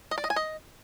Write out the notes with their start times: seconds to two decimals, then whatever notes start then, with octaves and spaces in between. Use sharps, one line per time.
0.11 D#5
0.18 D5
0.24 D#5
0.30 G#5
0.36 D#5